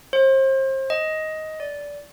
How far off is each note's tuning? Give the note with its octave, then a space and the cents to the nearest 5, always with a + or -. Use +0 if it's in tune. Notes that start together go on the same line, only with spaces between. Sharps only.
C5 +35
D#5 +10
D5 -15